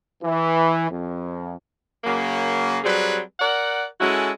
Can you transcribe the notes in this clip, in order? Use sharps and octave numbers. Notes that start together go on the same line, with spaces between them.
E3
F2
C#3 F#3 A#3
F#3 G3 C4 G#4 B4
A#4 D5 F#5
G#3 C#4 E4 F#4 A4